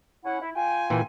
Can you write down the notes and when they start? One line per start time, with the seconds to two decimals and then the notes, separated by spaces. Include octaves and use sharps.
0.24 C#4 E4 F#5
0.41 E4
0.55 F4 G5 G#5
0.90 A#2 E3